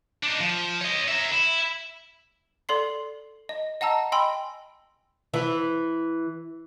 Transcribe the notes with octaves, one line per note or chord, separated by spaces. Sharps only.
D4 D#4
F3
C#5 D#5
A#4 E5
E4
A4 D5 C6 C7
D#5
D#5 F#5 A5 A#5 E6
D#5 G5 G#5 B5 C6 E6
E3